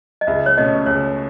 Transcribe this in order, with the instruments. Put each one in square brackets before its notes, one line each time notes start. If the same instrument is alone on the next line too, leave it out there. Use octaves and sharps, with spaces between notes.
[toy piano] D#5
[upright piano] C#2 [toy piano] E5
[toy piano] C#5
[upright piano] B2 A3 C#4 [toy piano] D#5
[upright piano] C#2 [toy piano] C#5